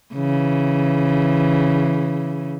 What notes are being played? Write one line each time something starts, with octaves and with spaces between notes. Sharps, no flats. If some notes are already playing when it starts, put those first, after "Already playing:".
C#3 E3